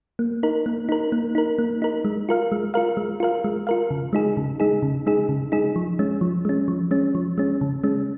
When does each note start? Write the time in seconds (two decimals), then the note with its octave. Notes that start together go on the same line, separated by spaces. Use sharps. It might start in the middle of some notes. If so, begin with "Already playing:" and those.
0.19 A#3
0.43 D#4 A#4
0.66 A#3
0.89 D#4 A#4
1.12 A#3
1.35 D#4 A#4
1.59 A#3
1.82 D#4 A#4
2.05 G#3
2.29 F4 A#4 F5
2.52 G#3
2.74 F4 A#4 F5
2.97 G#3
3.20 F4 A#4 F5
3.44 G#3
3.67 F4 A#4 F5
3.91 C#3
4.13 G#3 D#4 G#4
4.37 C#3
4.60 G#3 D#4 G#4
4.83 C#3
5.07 G#3 D#4 G#4
5.29 C#3
5.52 G#3 D#4 G#4
5.76 F3
5.99 G#3 C#4
6.21 F3
6.45 G#3 C#4
6.68 F3
6.91 G#3 C#4
7.15 F3
7.38 G#3 C#4
7.61 C#3
7.84 G#3 C#4